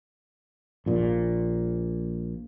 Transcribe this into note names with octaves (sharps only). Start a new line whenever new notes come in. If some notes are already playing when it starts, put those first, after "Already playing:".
A#1 A#2